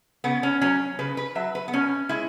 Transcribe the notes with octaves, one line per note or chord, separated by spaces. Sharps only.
C#3 B3
C#4
F#3 C#4
C#3 B4
B4
F#3 E5
B4
B3
B2 C#4
G#3 E4